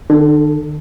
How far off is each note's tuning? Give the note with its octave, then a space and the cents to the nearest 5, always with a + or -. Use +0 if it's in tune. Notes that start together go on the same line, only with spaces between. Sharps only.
D3 +45 D4 +40 A4 +0